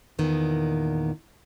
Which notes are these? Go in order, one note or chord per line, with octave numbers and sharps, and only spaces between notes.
E2 A#2 D#3 B3